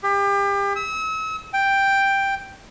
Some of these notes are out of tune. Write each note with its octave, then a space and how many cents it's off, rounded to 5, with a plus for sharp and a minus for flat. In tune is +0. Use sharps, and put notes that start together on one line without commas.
G4 +35
E6 -40
G5 +5